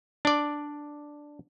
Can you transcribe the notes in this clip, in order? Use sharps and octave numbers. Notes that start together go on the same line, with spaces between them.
D4 D5